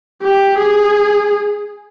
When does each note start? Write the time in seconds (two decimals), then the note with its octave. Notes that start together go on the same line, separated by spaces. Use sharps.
0.22 G4
0.58 G#4